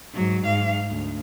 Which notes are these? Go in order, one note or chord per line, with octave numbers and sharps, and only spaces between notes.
G#2 F#3
G#2 F5
D2